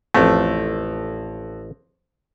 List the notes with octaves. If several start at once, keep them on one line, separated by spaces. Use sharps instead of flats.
A1 F2 A3